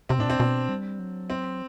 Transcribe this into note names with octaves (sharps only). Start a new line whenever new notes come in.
C3 C4
A2 D4
B2 C4
B2
G3
F#3
C4